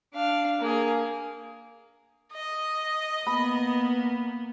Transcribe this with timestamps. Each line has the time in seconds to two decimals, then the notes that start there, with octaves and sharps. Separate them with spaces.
0.14 D4 F5
0.60 A#3 G#4
2.32 D#5
3.27 A#3 B3 B5